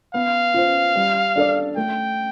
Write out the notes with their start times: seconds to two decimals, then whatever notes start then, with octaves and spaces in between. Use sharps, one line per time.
0.14 B3 F5
0.54 F4 C5
0.96 G3
1.36 D4 A4 D5
1.76 A3 G5